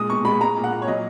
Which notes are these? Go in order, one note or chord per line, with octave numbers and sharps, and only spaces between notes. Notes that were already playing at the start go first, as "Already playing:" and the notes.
Already playing: A#2 G#3 D#6
B2 C#6
G#3 B5
G#3 A#5
A#2
F#5
A#2
C#5
F#3 D#5